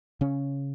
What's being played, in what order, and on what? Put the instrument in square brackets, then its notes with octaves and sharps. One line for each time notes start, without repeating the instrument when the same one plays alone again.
[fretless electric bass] C#3 C#4